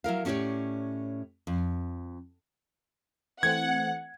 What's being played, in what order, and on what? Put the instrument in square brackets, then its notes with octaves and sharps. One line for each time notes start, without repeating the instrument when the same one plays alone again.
[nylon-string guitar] F#3 E4 A#4 F5
A2 C#4 F#4 G4 C#5 D5
F2
[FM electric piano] E3 A3 C4 [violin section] F#5 [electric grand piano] G#6